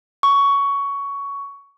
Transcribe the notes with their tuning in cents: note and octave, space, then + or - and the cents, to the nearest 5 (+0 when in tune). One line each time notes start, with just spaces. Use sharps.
C#6 +15